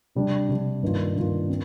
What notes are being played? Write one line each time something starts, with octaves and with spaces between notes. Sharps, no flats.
C3 G3 D4
C3 G3 D4
G2 D#3 A#3 D4 F4
G2 D#3 A#3 D4 F4
C4